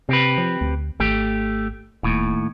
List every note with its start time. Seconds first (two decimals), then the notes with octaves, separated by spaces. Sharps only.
0.09 C3 C4 G4 B4
0.38 F3
0.61 D2
1.00 G#1 A3 G4
2.03 D#1 D#2 A2